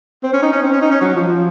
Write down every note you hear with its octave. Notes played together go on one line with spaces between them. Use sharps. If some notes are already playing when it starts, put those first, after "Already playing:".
C4
C#4
D#4
C#4
C4
C#4
D#4
C#4
F#3
F3
F3